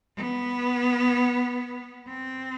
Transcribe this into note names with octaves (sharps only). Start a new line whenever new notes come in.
B3
C4